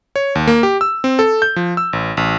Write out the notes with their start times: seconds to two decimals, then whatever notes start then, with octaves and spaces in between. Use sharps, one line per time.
0.16 C#5
0.35 D#2
0.48 A#3
0.63 G4
0.81 E6
1.04 C4
1.19 A4
1.42 G6
1.56 F3
1.77 E6
1.93 A1
2.17 A1